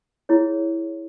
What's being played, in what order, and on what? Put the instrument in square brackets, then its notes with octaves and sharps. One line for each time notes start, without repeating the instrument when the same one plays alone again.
[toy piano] E4 G#4 C#5